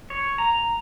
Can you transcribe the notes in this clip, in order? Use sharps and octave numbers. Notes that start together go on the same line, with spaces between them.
C#5
A#5